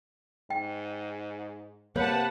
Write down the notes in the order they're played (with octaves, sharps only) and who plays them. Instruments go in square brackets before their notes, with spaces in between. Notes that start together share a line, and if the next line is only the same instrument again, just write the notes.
[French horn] G#2 [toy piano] G5
[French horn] C3 [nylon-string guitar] A#3 [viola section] B4 F#5 A5 [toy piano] C#5